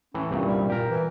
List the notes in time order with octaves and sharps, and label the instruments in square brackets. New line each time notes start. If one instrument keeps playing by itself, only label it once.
[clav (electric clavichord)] A2 E3 [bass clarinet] C#4
[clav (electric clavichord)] C2 G2 A#2
[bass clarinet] G3
[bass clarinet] A#2 [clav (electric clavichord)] G4 A#4
[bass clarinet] E3